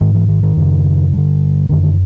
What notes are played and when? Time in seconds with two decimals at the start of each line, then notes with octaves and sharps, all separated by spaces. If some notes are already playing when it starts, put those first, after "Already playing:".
0.01 G#2 D#3
0.15 E3
0.29 D#3
0.43 D#3
0.57 F#2 C#3
1.13 G2 D3
1.69 F#2 D3 D#3